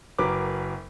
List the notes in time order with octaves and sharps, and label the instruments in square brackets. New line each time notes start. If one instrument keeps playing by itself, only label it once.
[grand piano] F#1 F#3 A#4 B4 D6